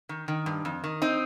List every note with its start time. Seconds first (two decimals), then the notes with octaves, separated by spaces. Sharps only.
0.09 D#3
0.28 D#3
0.46 G2
0.65 F2
0.84 D#3
1.02 C4 D#4